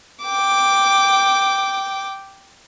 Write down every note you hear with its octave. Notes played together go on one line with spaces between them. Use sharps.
G5 D6